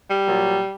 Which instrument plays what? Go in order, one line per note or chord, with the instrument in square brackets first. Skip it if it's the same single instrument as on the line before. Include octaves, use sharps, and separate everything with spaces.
[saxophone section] G3
A#2 F#3